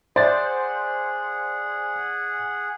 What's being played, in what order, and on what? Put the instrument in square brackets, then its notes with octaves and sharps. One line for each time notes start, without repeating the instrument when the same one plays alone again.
[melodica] G#4 F#5 [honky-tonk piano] C5 [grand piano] D5 E5 A6